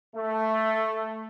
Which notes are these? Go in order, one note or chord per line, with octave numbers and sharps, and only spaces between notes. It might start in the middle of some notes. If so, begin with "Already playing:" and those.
A3